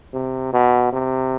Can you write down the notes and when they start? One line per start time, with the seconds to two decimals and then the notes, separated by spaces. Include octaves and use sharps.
0.14 C3
0.53 B2
0.93 C3